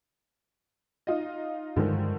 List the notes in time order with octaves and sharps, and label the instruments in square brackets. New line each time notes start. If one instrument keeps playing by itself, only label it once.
[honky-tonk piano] D#4 F4 D#5
[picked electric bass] G2 G#3 [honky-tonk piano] D3 D#3 F3